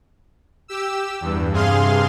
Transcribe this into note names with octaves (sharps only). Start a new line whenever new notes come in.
G4 E6
E2 G2
G2 C3 G#4 F5 C6